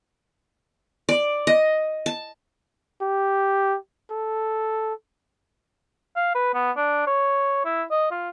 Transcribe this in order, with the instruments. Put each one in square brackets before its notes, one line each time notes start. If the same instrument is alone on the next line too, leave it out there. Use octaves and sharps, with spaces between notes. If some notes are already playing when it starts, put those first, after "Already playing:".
[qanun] D5
D#5
A5
[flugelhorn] G4
A4
[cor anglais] F5
B4
B3
D4
C#5
E4
D#5
F4